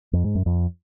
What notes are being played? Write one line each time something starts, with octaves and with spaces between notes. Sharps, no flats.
F2
G#2
F#2
F2